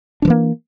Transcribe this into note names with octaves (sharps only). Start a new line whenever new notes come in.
E3 F3 A#3 D4